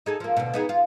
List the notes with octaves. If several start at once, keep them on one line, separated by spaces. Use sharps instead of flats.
D#4 G#4 A4
F3 A#3
D2 B2
B3 D#4 G#4
F4